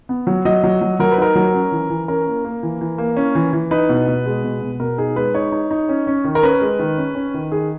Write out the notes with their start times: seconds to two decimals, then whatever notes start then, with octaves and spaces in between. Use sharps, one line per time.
0.09 B3
0.27 F#3
0.45 F#3 D#5
0.64 F#3
0.81 F#3
1.00 F#3 A#4
1.12 B4
1.18 D#4 A#4
1.35 F#3
1.54 C#4
1.72 E3
1.90 E3
2.08 C#4 A#4
2.27 A#3
2.45 A#3
2.63 E3
2.81 E3
2.98 A#3
3.17 C#4
3.35 E3
3.53 E3
3.71 D#4 B4
3.89 B2
4.08 B2
4.26 G#3
4.44 B2
4.61 B2
4.80 B2 A#4
4.98 D#4 G#4
5.16 G#3 B4
5.34 D#4 C#5
5.52 D#4
5.71 D#4
5.89 C#4
6.07 C#4
6.25 D#3
6.35 A#4
6.43 C#4 B4
6.62 G#3
6.79 D#3
6.98 C#4
7.15 C#4
7.34 D#3
7.52 D#3 G#4